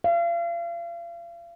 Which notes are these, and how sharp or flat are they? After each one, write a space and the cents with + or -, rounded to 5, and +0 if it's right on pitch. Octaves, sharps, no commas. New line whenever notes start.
F5 -35